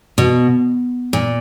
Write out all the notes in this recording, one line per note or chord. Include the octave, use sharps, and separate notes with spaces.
B2
A#2